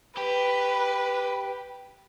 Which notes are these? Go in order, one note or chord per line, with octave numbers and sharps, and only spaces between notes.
G4 B4